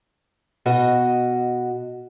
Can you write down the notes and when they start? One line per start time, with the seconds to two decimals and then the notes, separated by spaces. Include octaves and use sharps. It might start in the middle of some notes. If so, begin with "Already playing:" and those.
0.66 B2 F#4 D#5